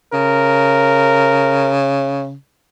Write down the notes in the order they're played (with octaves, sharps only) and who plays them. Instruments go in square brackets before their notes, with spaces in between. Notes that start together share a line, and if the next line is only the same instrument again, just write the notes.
[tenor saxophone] C#3 [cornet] A#4